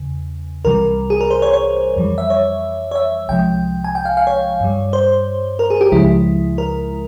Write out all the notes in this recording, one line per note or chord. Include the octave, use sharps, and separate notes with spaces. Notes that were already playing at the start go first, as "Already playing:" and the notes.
Already playing: E2 C#3
C2 C3 E3 G3 A#4
G#4
A#4
C5
C#5
C#5
F2 E3 G3
E5
C#5
C#5
E5
C2 C3 F3 G#3 G5
G#5
G5
F5
F5
C#5
G2 G3
C5
A#4
G#4
G4
C#2 C#3 F3 G#3 E4
A#4